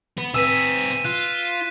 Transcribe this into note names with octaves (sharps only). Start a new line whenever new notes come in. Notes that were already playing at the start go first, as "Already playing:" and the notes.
B3
C4 G#4 B4 E6 B6 D#7 E7
F4 F#6